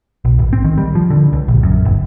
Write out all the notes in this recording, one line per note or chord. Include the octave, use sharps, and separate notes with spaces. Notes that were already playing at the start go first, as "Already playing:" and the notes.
B1
G#1
C4
D#3
G3
F3
D3
C#2
A#1
F#2
G1